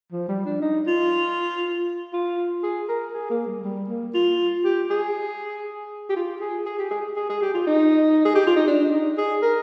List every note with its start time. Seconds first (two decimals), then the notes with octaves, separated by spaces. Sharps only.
0.12 F3
0.28 G3
0.45 D4
0.62 D#4
0.87 F4
2.13 F4
2.63 G#4
2.89 A#4
3.14 G#4
3.30 A#3
3.47 G3
3.64 G3
3.89 A#3
4.14 F4
4.65 G4
4.90 G#4
6.10 G4
6.16 F4
6.41 G#4
6.66 G#4
6.79 G4
6.91 G#4
7.16 G#4
7.29 G#4
7.42 G4
7.54 F4
7.67 D#4
8.25 G#4
8.35 G4
8.46 F4
8.56 D#4
8.67 D4
8.93 D#4
9.18 G#4
9.42 A#4